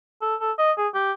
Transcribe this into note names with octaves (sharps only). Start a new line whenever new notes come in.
A4
A4
D#5
G#4
G4